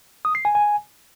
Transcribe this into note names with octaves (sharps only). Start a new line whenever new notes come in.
D#6
C7
G#5
G#5